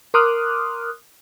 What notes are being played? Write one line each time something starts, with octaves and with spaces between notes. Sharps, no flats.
A#4 C6 D6 D#6 F6 F#6